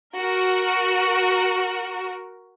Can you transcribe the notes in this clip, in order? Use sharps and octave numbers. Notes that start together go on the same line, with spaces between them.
F#4 A#4